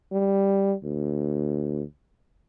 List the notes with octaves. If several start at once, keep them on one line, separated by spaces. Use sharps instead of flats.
G3
D2